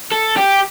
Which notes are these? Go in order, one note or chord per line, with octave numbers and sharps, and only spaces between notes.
A4
G4